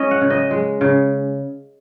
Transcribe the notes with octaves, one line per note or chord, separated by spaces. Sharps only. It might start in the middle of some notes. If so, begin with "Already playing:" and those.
Already playing: G#3 C#4 D#5
F#5
C#3
D#5
G#3
C#3